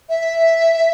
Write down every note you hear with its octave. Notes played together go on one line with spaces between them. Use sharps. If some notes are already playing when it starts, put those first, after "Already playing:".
E5